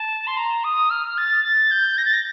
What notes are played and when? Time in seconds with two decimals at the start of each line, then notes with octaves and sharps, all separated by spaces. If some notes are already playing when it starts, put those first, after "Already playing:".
Already playing: A5
0.27 C6
0.37 A#5
0.64 D#6
0.90 F6
1.18 A6
1.45 A6
1.71 G6
1.98 A#6
2.05 A6
2.13 A#6